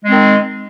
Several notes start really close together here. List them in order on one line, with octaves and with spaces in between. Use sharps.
G#3 C4 D#3